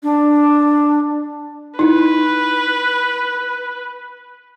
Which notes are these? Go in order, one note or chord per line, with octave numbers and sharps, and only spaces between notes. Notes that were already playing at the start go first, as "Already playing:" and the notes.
D4
D#4 E4 B4